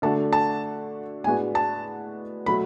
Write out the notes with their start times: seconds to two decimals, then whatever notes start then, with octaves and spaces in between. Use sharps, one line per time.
0.02 D3 A3 D4 F#4 A5
0.33 A5
1.24 A2 G#3 B3 D4 F#4 G#5
1.55 A5
2.46 B2 F#3 A3 B5